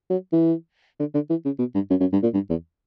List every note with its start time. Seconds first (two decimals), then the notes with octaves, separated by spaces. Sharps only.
0.10 F#3
0.32 E3
0.99 D3
1.14 D3
1.30 E3
1.45 C#3
1.59 B2
1.75 G2
1.90 F#2
2.00 F#2
2.13 G2
2.23 A#2
2.34 G2
2.50 E2